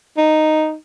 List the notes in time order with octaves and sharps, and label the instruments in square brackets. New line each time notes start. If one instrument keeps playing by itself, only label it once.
[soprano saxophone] D#4